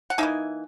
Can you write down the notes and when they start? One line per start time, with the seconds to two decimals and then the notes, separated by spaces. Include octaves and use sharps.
0.10 F#5
0.18 E3 A#3 D#4 E5 G#5